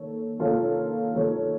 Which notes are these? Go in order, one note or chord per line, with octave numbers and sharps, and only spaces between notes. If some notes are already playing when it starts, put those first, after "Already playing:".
Already playing: D#3 A#3 A4 C#5
D#3 A#3 F4 A4 C#5
D#3 A#3 F4 A4 C#5